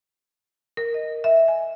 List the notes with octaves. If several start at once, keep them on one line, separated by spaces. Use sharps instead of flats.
A#4
D#5
E5
G#5